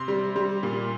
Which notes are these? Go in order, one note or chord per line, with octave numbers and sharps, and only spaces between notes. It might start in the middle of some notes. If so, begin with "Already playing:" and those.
Already playing: C3 C6
G3
G3
A#2